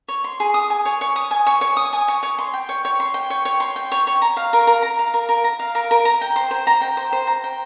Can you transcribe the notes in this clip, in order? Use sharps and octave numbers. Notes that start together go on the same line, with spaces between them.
C#5
C6
G#4
D#6
G#5
C#5
C#5
D#6
G#5
C#5
C#5
D#6
G#5
C#5
C#5
C6
G5
C#5
C#5
C6
G5
C#5
C#5
C6
G5
C#5
C#5
A#5
F5
A#4
A#4
A#5
F5
A#4
A#4
A#5
F5
A#4
A#4
A#5
G5
C5
C5
A#5
G5
C5
C5
A#5
G5